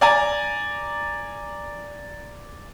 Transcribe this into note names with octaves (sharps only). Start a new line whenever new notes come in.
D5 G#5 A#5